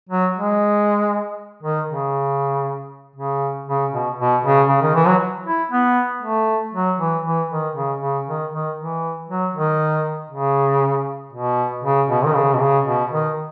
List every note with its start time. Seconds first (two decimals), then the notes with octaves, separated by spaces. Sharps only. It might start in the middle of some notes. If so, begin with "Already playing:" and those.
0.09 F#3
0.36 G#3
1.63 D#3
1.88 C#3
3.16 C#3
3.67 C#3
3.92 B2
4.19 B2
4.44 C#3
4.69 C#3
4.82 D#3
4.95 E3
5.07 F#3
5.46 E4
5.71 B3
6.22 A3
6.74 F#3
6.99 E3
7.25 E3
7.51 D#3
7.75 C#3
8.01 C#3
8.27 D#3
8.53 D#3
8.78 E3
9.29 F#3
9.54 D#3
10.31 C#3
11.33 B2
11.84 C#3
12.09 B2
12.25 D#3
12.35 C#3
12.54 B2
12.61 C#3
12.86 B2
13.12 D#3